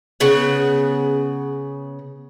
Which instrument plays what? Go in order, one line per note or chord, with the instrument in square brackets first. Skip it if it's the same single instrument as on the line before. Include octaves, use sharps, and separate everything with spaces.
[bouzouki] C#3 B3 F#5